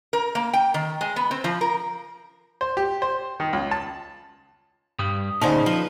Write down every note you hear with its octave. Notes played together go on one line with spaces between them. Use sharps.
A#4
A#3
G5
D#3
G#3
B3
C4
F3
A#4
C5
G4
C5
D#3
C#2
A5
G2 G3 D#6
D2 A#2 C#3 C#4 D#4 C5 D5 A5
F3 B4